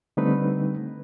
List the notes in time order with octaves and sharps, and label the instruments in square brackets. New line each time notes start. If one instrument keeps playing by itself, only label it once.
[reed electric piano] D3 G3 A3 C4 D#4 B4